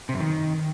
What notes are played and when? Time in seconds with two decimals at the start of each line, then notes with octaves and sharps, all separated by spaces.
0.09 C3
0.14 F#2
0.20 D#3